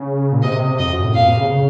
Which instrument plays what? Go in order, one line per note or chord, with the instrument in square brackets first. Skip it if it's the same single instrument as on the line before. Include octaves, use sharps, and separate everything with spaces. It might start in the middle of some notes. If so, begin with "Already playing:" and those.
Already playing: [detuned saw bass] C#3
A#2
[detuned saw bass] C3 [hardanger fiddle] D#5
[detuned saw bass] F2 [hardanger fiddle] D#5
[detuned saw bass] F#2
A2
[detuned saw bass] A#2 [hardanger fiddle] F5
[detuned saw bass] C3
C#3
C#3